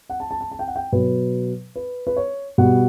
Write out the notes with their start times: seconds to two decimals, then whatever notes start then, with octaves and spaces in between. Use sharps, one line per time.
0.10 F#5
0.20 A5
0.31 A5
0.41 A5
0.52 A5
0.59 G5
0.68 F#5
0.76 G5
0.92 B2 F#3 B4
1.76 B4
2.07 B4
2.16 C#5
2.58 B2 G3 F#5